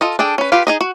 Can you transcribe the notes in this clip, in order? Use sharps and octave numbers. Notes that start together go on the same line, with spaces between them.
F4 A4 D#5
D4 G#4 A4 G5
C#4 B4
F4 G4 B4 F5
D#4 G#4 D#5
F#4